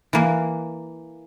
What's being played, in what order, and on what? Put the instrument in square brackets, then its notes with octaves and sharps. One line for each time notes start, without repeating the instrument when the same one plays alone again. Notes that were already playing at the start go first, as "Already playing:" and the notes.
[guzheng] E3 A#3